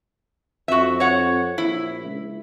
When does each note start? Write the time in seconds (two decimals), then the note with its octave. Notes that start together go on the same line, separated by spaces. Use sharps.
0.68 F2 F#4 E5
1.00 C#5 F#5
1.58 A#1 E4
2.04 C#2